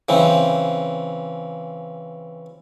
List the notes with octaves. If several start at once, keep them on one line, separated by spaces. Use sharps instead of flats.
C#3 E3 C4